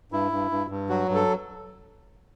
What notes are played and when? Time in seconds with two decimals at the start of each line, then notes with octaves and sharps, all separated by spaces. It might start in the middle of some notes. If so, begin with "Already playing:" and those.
0.12 G2 E4
0.32 G2
0.51 G2
0.70 G2
0.89 F#3 F#4
1.09 G2
1.15 A4